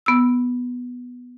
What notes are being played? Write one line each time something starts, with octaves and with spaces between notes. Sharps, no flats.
B3 E6